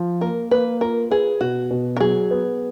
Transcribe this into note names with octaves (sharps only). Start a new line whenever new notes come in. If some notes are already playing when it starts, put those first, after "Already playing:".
Already playing: F3
A#3 A#4
A#3 B4
F4 A#4
G#4 B4
B2 F#4
B2
A#4
F#3 G#4
B3